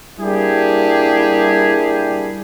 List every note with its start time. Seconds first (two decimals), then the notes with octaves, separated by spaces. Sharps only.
0.19 G3 A#3 D4 E4 G4 G#4